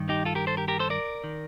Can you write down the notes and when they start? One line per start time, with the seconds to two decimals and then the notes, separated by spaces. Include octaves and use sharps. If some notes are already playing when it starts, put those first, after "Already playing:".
Already playing: G2 D#3
0.09 D#4 G4
0.25 F4 A4
0.35 G4 A#4
0.47 A4 C5
0.57 G4 A#4
0.68 G4 A#4
0.79 A4 C5
0.90 A#4 D5
1.24 D#3